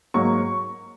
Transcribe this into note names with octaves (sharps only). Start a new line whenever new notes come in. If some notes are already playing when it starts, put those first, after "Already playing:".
G#2 F#3 A#3 C#6